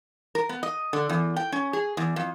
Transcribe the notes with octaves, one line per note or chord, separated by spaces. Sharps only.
A#4
B3
D#5
D3
E2
G5
C#4
G#4
E2
F2